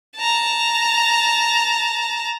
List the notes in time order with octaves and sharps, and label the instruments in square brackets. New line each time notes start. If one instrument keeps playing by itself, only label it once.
[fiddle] A5 A#5